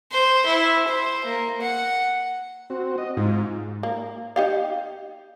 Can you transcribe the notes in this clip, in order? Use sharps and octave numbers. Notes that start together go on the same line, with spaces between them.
C5
E4
C5
A#3
F#5
C4 F#4
D#5
G#2 F4
A#3
D#4 G4 F5